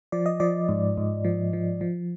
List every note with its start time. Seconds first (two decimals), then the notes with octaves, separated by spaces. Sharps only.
0.12 F3 D5
0.26 D#5
0.40 F3 D5
0.69 G#2
0.98 G#2
1.25 F3
1.53 F3
1.81 F3